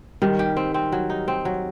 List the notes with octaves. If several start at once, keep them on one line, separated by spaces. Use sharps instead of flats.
D#3 G3
G4
C4
C4
F#3
D#4
C4
F#3